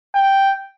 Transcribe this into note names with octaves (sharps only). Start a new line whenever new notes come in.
G5